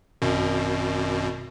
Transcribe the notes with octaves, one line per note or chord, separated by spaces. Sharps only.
G#1 F#2 B2